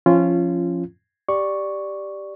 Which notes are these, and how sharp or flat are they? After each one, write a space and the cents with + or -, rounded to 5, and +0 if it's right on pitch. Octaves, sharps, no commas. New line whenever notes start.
F3 +0 C#4 -15 F4 -20
G4 +0 D5 +0 C#6 +0